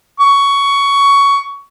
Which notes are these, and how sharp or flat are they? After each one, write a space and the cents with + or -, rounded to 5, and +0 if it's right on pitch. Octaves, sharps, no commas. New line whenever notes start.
C#6 +15